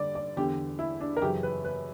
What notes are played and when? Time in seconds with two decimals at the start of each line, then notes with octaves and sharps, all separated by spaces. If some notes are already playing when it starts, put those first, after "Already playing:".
Already playing: G2 D3 D5
0.15 D5
0.37 E2 D3 G4
0.79 E4
1.01 D4
1.17 A#4
1.22 F#2 C#3 E3 G4
1.43 B4
1.65 B4